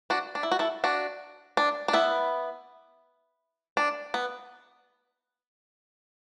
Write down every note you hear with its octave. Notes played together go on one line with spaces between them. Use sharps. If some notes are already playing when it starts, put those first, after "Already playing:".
D4 F#4
D4
E4
F#4
E4 A4
D4 F#4
D4
D4
B3 E4
D4
B3